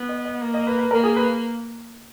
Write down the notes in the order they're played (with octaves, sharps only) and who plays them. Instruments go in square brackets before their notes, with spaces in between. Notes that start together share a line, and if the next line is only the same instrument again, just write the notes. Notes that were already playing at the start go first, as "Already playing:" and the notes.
Already playing: [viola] B3
[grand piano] D#5
D#5
[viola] A#3
[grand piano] D#5
B4
B4
[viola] A#3 [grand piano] A#4
[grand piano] G#4
B4